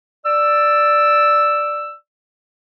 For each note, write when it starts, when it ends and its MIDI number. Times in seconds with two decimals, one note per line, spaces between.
0.25 1.95 74
0.25 1.95 88